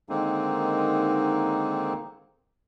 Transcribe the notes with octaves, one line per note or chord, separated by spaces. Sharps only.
D3 D#3 G#3 A#3 C4 D#4